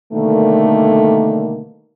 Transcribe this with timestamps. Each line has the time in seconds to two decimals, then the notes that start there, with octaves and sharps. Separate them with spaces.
0.13 B2 D3 D#3 G3 A3 A#3